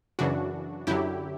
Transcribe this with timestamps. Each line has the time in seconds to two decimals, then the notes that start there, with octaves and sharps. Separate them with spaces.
0.19 F#2 C#3 E3 D4 F#4
0.87 F#2 D3 F#3 E4 G4